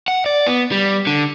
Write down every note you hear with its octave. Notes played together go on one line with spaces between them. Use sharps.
F#5
D5
B3
G3
D3